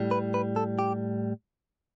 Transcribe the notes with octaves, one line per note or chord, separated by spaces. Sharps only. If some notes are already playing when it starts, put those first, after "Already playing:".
Already playing: A2 G3
B4
B4
A4
G4